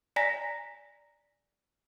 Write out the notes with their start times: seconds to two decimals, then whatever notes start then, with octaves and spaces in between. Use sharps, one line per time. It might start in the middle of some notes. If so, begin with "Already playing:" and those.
0.16 D5 G#5 A#5 A#6 B6